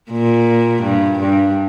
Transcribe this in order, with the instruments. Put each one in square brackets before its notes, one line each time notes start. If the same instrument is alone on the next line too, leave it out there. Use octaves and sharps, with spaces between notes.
[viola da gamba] A#2
G2
G2